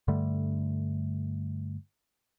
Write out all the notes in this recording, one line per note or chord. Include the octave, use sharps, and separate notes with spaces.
G2 D3 G3 A3